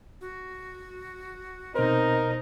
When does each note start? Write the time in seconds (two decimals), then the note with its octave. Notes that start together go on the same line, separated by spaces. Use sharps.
0.21 F#4
1.75 B2 C4 D#4 A#4 C5